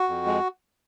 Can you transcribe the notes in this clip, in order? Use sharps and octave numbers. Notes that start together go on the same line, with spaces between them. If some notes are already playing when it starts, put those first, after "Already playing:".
Already playing: F#4
F2
G#3